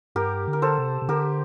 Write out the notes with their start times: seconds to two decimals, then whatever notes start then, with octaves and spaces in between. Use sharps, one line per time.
0.15 G2 G4 A#4
0.47 D3
0.53 A#4
0.62 A4 C5
0.78 C3
1.02 C3
1.08 D3 G4 A#4